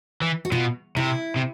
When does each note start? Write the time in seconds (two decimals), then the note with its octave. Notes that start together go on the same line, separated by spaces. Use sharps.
0.22 E3
0.45 F#4
0.52 B2 F4
0.96 C3 E4
1.36 C3